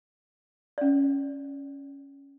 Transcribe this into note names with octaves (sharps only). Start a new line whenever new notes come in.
C#4 D5